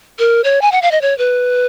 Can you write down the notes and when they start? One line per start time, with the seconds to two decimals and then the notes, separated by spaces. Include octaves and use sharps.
0.19 A#4
0.44 C#5
0.62 G#5
0.72 F#5
0.82 F5
0.91 D#5
1.02 C#5
1.18 B4